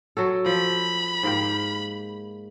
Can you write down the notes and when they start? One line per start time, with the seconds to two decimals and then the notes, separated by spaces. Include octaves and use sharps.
0.17 F#3 F#4 A4
0.46 F3 B5
1.23 G#2 A#3 G4